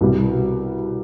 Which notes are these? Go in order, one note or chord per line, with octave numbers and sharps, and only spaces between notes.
C2 B2 G3